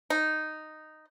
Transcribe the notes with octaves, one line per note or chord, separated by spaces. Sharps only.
D#4